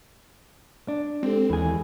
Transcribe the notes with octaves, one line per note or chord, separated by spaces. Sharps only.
D4
G#3 C4 G4 A4
D#2 E3 G#4